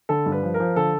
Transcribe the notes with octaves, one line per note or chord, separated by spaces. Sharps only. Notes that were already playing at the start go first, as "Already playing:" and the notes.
D3 A4
G2
B4
F3
A#4
F3
D3 A4